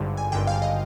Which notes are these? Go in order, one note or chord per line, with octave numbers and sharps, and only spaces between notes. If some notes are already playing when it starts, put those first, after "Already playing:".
Already playing: G#1 G2 D3
G#5
G#1 G2 D3 G5
F5
D#5